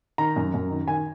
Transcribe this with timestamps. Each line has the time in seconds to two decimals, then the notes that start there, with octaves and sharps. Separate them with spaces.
0.18 D#3 A#5
0.36 F#2
0.54 F#2
0.71 D#3
0.88 D#3 G#5